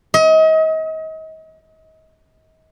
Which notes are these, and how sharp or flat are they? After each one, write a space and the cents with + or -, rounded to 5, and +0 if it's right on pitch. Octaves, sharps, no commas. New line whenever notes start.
D#5 +35